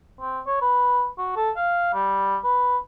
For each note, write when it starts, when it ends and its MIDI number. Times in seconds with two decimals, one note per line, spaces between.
0.20 0.40 60
0.47 0.61 73
0.61 1.07 71
1.18 1.33 66
1.36 1.51 69
1.56 1.94 77
1.94 2.37 55
2.44 2.77 71